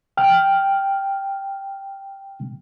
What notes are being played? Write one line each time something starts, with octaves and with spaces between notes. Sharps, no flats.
G5 F6